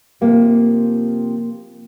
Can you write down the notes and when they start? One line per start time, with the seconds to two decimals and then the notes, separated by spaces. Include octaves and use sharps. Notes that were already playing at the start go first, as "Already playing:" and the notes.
0.21 C3 F3 A#3